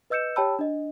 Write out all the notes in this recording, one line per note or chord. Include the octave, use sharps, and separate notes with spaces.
B4 D#5 E6 G6 C#7 E7
G4 C#5 G5 A5 B5 E6
D4 D#5